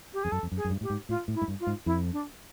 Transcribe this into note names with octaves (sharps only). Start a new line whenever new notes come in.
G4
F2 G#4
F#2 A4
F2
F#2
G#4
F#2
G2
A2 G4
G#2
A2 F4
A2
E4
G#2
G2
F4
G#2
F2 E4
D4